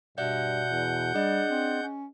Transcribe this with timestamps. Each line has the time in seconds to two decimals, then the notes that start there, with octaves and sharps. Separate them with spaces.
0.18 G2 B2 D5 E5 F#5 G6
0.70 E2
1.14 G3 D4 G#4 D#5
1.50 C4
1.82 C#4